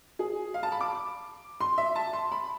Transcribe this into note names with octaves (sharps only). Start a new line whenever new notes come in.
G#4
F5
A5
B5
D6
C6
E5
A5
C6
B5